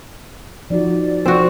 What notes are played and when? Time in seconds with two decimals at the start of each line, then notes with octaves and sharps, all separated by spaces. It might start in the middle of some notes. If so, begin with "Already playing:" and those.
0.70 F3 D#4 F#4 D5
1.26 F3 C4 F#4